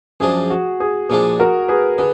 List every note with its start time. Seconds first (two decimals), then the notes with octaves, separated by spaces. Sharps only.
0.20 F#2 F3 G#3 D4 G#4
0.50 F#4
0.80 G#4
1.09 A#2 F3 G#3 D4 G#4
1.39 F#4 A#4
1.68 G#4 B4
1.98 D3 G#4 B4